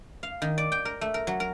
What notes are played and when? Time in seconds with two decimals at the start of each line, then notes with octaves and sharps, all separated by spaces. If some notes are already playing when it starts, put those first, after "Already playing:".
0.23 F5
0.42 D#3
0.58 D5
0.72 G5
0.85 A#4
1.01 A3
1.14 A#4
1.27 F#3
1.40 A#4